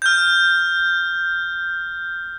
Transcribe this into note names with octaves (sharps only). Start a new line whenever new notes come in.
F6 G6